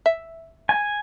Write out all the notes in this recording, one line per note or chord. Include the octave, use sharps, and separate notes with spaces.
E5
G#5